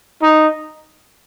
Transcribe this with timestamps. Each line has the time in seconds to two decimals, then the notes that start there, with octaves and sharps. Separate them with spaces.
0.22 D#4